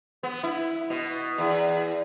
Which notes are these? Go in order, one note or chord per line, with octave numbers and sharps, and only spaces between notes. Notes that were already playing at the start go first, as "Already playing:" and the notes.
B3
E4
B2
E2